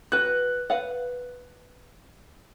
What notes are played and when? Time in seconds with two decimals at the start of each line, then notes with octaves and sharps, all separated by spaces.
0.12 F#4 B4 F#6
0.70 B4 F5 F#5